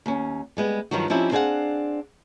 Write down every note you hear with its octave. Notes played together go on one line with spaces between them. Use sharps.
D#2 C#4
G3 G#3 B3
G2 D#3 F3 F#3 F#4
F3 C4 C#4 D#4 E4 G4
C4 D4 G#4 C#5 F5 F#5